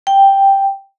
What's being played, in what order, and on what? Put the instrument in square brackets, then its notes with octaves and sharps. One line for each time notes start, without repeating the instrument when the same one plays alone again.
[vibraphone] G5